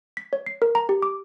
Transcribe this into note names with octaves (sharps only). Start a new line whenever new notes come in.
B6
C#5
C7
A#4
A#5
G4
D6